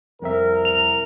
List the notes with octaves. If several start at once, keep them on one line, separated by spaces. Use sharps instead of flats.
C2 F2 C4 A#4 E5
F7